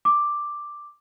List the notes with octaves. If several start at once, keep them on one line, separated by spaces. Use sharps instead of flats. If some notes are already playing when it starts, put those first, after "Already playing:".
D6